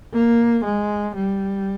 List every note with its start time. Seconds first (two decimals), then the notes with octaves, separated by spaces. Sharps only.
0.13 A#3
0.64 G#3
1.16 G3